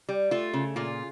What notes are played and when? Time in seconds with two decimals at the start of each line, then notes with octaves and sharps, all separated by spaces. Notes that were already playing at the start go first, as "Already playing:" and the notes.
0.09 G3
0.31 A3 F4
0.54 C#3
0.76 A#2 F4